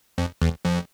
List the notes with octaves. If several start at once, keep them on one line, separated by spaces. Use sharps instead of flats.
F2
E2
F2